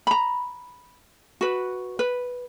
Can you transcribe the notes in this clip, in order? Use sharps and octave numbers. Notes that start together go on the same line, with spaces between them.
A#5 B5
F#4 B4
B4